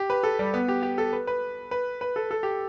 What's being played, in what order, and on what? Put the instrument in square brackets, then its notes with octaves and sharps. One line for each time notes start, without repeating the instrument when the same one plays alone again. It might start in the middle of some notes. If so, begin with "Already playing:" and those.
Already playing: [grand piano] G4
B4
A4
G3
B3
G4
G4
A4
B4
B4
B4
B4
A4
A4
G4